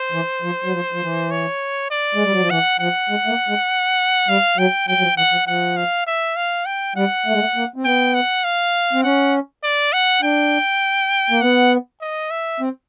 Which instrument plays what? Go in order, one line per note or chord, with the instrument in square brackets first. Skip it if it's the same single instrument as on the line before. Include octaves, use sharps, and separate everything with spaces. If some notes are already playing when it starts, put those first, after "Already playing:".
Already playing: [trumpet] C5
[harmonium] E3
F3
F#3
F3
F3
E3
[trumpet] C#5
D5
[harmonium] G#3
G3
F#3
F3
[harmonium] E3 [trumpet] F#5
[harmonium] F3 [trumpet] F#5
[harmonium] G#3
A3
A#3
G#3
[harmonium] G3 [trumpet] F5
[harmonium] F#3 [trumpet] G5
[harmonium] F#3 [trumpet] G5
[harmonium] F#3
F3
[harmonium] E3 [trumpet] F#5
[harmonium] F3
[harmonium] F3 [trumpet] F#5
[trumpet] F5
E5
F5
G5
[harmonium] G3 [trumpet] F#5
[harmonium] A3
G#3
A3
A#3
C4
[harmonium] B3 [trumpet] G5
[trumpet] F#5
F5
[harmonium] C4
[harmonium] C#4 [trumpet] F#5
[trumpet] D5
F#5
[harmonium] D4 [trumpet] G5
[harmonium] A#3
[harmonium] B3 [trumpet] F#5
[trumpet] D#5
E5
[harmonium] C4